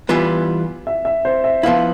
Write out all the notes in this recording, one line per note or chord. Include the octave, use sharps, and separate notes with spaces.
E3 G3 B3 F4
E5
E5
C5
E5
F3 B3 E4 F5